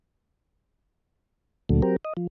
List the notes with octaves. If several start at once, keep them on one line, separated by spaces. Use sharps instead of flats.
D2 A#2 D3 F#3 A3
F#3 C4 G4 A#4
D#5
F3